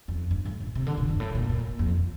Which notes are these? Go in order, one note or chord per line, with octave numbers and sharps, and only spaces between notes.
F2
G2
A2
A#2
C3
D3
A#2
G2
A2
A#2
A#2
F2